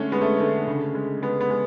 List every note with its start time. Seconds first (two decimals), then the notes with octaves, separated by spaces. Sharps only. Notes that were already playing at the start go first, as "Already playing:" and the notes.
Already playing: D3 G#3 A3 C#4
0.12 G#3 B3
0.21 A3
0.40 D3 A3
0.67 C#3
0.95 G#3
1.22 G#3 B3
1.41 B3
1.50 G#3